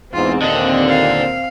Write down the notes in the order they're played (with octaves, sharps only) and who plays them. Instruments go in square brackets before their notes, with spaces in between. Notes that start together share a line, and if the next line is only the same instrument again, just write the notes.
[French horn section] E2 G#2 [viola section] C4 [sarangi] F4
[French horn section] D#2 A#2 [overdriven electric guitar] D3 [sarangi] D#5
[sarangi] F5